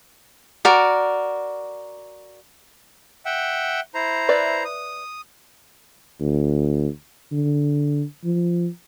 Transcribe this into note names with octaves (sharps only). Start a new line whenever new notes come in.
F#4 A#4 D5
E5 F#5 G5
E4 C5 A#5
B4 D5 E5
D#6
D2
D3
F3